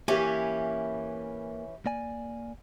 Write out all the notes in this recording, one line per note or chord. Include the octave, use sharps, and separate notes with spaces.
E3 A#3 C#4 G4
A#3 D5 G#5